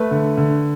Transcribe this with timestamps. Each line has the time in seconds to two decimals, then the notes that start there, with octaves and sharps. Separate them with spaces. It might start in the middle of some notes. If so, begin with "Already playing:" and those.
Already playing: A3 B4
0.11 D3
0.37 D3